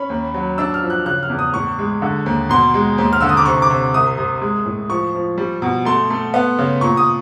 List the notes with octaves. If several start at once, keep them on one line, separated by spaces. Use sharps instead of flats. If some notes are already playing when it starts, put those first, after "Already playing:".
Already playing: C#4 B5
D#2
F#3
D4 E6
F6
F3
F#6
C#3 F#6
F6
E2
D#6
A2 C#6
G#3
D3
D#2
B2 C6
G#3
D#2
F6
D3 E6
D#6
D6
C3 C#6
D6
C3
C2 D#6
C3
G#3
A2
F3 C#6
F3
G3
B2
A3 C6
A3
B3
C#3
A#2 C#6
D#6